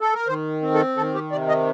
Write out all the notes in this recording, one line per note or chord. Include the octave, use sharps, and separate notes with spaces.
A4
A#4
D#3 C5
C4
A4
D#3 A4
G4
C3 D5
D#5